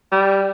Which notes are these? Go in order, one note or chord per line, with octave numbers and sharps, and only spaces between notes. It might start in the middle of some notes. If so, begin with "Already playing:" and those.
G3